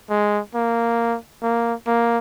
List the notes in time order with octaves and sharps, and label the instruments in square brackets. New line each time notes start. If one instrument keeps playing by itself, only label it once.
[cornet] G#3
A#3
A#3
A#3